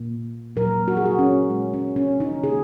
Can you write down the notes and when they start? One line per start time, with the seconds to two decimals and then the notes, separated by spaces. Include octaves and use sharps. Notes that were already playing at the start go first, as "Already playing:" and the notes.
Already playing: A#2 A#3
0.56 A#2 F#3 A#3 A#4
0.88 F#4
0.97 G#4
1.06 F#4
1.19 C#4
1.49 A#2 G#3
1.73 C#4
1.96 C#4
2.20 D#4
2.43 C#3 A#3 G#4